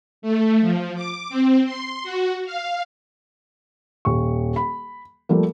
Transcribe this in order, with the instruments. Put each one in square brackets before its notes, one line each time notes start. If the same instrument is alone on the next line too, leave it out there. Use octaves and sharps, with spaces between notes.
[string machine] A3
F3
D6
C4
C6
F#4
F5
[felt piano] D#1 C#6
B5
F3 G3 A3 A#3